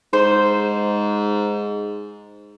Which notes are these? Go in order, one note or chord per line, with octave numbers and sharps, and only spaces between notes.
G#2 C5